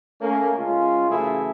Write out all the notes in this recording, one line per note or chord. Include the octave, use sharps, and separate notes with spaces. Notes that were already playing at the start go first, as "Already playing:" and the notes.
A3 A#3 C#4
C#3 G#3 C#4 F4
F#2 C#3 E3 A3 E4 G#4